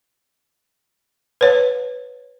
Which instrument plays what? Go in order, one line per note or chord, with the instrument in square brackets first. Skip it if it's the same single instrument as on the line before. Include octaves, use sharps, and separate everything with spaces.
[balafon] B4 C#5